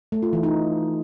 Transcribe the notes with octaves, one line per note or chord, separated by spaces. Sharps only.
A3
F4
E3
D#4